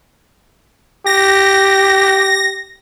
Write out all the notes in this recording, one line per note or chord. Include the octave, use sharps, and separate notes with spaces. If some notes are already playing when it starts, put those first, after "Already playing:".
G4 A#6